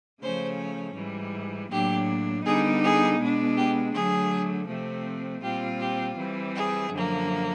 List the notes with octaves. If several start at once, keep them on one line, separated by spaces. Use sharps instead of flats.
C#3 F3 A3 C#4 C5
G#2 E3 G3
A2 F#3 A#3 D4 G4
D3 G3 B3 D#4 G#4
G#4
B2 G#3 B3 D4
G4
D3 F#3 A3 G#4
C3 F3 A3 C4
A#2 G3 C4 F4 G4
G4
E3 G3 C4
G#4
F#2 D3 F3 A#3